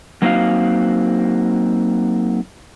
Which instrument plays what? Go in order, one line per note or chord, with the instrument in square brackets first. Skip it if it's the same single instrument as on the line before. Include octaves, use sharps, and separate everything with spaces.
[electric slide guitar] F#3 A#3 C4 D#4 F#4 F5